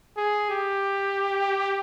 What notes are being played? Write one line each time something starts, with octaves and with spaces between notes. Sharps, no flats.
G#4
G4